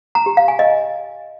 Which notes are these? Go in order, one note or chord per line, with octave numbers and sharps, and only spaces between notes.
A#5
G4
F5
G#5
D#5